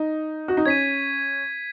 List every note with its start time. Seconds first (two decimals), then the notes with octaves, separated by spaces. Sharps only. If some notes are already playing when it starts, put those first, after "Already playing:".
Already playing: D#4
0.48 F#4
0.57 D#4
0.66 C#4 G#6 B6 D#7